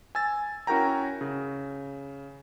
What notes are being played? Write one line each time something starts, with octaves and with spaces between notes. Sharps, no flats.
G#5 E6 A6
C#4 E4 F#4 A#4 G5 A#5
C#3